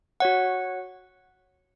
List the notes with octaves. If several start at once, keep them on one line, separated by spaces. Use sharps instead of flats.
F#4 C#5 F#5